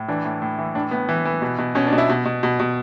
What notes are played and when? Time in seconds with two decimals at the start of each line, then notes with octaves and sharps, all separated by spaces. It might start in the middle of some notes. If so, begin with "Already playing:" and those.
Already playing: A2
0.08 E3 D4
0.25 A2
0.42 A2
0.58 E3
0.75 A2 D4
0.91 A2 B3
1.09 E3
1.25 E3
1.42 B2
1.58 B2
1.75 B2 C#4
1.87 D4
1.93 B2
1.98 E4
2.09 B2
2.25 B2
2.43 B2
2.60 B2